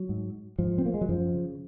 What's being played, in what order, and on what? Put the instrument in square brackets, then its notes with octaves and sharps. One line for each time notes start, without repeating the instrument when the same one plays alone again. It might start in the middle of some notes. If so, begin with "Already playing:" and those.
Already playing: [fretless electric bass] F#3
G#2
G#2 F3
C4
A#3
G#3
F#3
F#2 F3
C#3